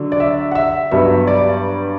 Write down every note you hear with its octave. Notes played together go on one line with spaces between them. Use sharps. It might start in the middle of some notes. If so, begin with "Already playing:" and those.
Already playing: D3 F#3 D4
D5
E5
F#5
E5
G2 F#3 B3 E5
D5